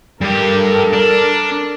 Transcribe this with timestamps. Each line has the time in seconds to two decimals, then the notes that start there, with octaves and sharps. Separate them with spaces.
0.21 G2 G4 A4 A#4
0.93 D4